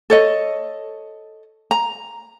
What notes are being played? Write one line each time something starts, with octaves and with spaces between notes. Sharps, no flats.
A4 C#5 D#5
A#5